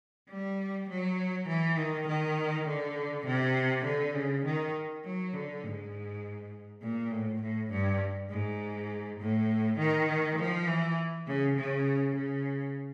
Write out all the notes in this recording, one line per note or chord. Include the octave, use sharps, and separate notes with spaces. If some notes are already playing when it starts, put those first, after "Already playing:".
G3
F#3
E3
D#3
D#3
D3
C3
D3
C#3
D#3
F#3
D3
G#2
A#2
A2
A2
G2
G#2
A2
D#3
F3
E3
C#3
C#3
C#3